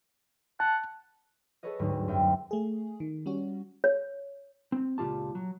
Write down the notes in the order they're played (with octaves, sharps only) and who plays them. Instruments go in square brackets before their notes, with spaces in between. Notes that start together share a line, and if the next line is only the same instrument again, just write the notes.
[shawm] F#5 [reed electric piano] A5
[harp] G#4 A4 B4 C#5 D#5
G1 D2 G#2 F#3
F#2 C4 E5 G5
[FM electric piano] A3 G#4
D#3
G3 C#4 F#4
[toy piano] C#5
[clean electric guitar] C4
C#2 A#2 D3 F4 G4 A5
F#3